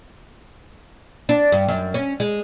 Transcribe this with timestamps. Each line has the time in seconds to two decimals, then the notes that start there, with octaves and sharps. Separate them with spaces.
1.29 D4
1.52 G2
1.69 F#2
1.94 C#4
2.20 G#3